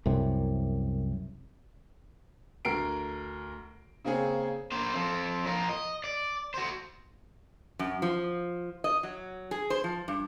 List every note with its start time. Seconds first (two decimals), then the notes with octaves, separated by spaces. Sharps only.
0.06 C2 F#2 C3
2.65 D2 A#4 C7 D7
4.05 C#3 A#3 C4 C#4 G#4
4.72 A#3 C5
4.94 F3 C4
5.46 F3 A#4
5.69 D#5
6.04 D5
6.54 F#4 C5
7.79 F#2
8.02 F3
8.84 D#5
9.03 F#3
9.51 G#4
9.70 C5
9.84 F3
10.08 G2